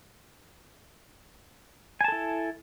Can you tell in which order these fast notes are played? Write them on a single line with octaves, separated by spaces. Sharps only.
G#5 A5 A4 E4